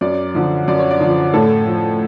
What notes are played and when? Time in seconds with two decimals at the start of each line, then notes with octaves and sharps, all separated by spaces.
0.01 F#2 D5
0.34 D3 F3
0.68 F#2 D5
0.79 C#5
0.91 D5
1.01 D3 F3
1.34 A2 A4
1.67 F3